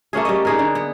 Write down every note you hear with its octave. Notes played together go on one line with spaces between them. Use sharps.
A3 A#3 C#4 G#4
G3 D#5
D#4 G#4 A#4
D3
B3